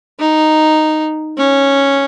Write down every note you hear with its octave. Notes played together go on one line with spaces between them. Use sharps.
D#4
C#4